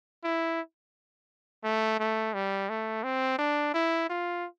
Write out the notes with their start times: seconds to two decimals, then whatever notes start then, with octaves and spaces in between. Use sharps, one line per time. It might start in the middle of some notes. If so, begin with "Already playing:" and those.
0.24 E4
1.64 A3
2.00 A3
2.34 G3
2.70 A3
3.04 C4
3.39 D4
3.74 E4
4.10 F4